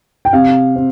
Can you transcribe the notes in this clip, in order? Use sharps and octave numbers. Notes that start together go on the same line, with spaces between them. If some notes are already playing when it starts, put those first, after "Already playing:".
G5
C3 F5
C4